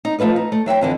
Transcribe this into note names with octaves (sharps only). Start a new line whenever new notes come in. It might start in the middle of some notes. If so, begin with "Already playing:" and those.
D#4
F3 A3 F4 B4 D#5
D#4
A3
F#3 E5 F#5 G5
F2 D3 E3